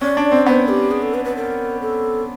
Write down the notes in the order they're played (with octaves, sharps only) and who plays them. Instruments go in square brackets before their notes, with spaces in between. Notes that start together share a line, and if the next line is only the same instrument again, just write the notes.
[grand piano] C#4 [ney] D5
[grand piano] D4
C4
[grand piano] B3 [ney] C5
[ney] G4
G#4
A4
B4
B4
A#4
A4